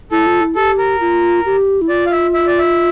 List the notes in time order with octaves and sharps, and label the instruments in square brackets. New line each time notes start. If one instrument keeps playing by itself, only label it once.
[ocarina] E4 [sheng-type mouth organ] A4
[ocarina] F4
E4
[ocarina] G4 [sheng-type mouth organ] A4
[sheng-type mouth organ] A#4
[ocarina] F4
G4
E4
[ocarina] F4 [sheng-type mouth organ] D5
[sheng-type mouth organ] F5
E5
E5
D5
E5